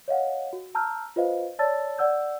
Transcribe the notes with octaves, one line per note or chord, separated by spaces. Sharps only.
C#5 D#5 F5 F#5
F#4
A5 A#5 E6 F6 G6
F4 B4 C5 D#5 F5
C#5 D5 A5 E6 A6
D5 F#5 E6 G6